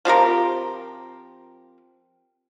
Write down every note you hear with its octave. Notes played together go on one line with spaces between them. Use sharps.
F3 C4 G4 A#4